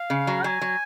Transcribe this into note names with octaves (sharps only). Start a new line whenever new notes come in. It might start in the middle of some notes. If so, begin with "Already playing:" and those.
Already playing: F5
C#3
F#3
F#3 G#5
F#3